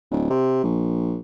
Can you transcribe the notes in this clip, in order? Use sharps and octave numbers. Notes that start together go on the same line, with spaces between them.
D1
C3
A#1